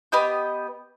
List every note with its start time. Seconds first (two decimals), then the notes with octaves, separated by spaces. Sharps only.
0.12 B3 G4 D#5 G6